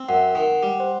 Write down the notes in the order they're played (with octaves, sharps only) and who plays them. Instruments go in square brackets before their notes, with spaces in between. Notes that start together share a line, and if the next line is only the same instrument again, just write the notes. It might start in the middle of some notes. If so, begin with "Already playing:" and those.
Already playing: [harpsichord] C4
[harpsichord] F#2 [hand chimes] F#5
[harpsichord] D#3
G3
[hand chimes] C5